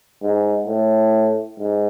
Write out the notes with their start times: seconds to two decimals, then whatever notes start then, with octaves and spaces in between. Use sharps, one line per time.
0.22 G#2
0.67 A2
1.59 G#2